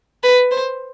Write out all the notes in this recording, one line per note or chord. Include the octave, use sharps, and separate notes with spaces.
B4
C5